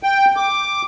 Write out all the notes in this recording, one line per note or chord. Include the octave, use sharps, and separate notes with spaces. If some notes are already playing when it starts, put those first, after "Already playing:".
G5
D6